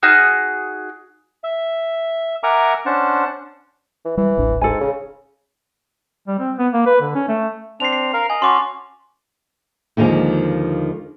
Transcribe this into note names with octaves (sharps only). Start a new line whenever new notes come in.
D#4 F#4 G#4 F6
E5
A#4 E5 F#5 G#5 A#5 D6
C#4 D4 C5 F#5 A5
E3
E3 G3
D#1 A1 D4
G#2 A4 G#5
C#3
G3
C4
B3
A#3
B4
D3
C#4
A3
C4 D4 C7 F7
C7
A#4 F5
D#5 G#5
C#4 F#4 A5 C6 D6
D#2 D3 D#3 F3 G#3